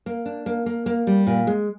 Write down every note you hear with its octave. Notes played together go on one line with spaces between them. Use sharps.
A#3
D4
A#3
A#3
A#3
G3
A#2
G#3